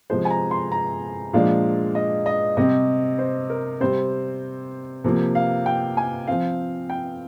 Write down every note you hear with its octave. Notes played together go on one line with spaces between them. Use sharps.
C3 F3 G#3 C5
G#5
A#5
C6
A#5
A#2 F3 G#3 D4 F5
D#5
D#5
C3 G3 C4 D#5
C5
A#4
C3 G3 C4 C5
C3 F3 A#3
F5
G5
G#5
F3 C4 F5
G5